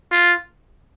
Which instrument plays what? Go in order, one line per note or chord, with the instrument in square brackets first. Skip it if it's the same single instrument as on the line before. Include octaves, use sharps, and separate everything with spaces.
[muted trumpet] F4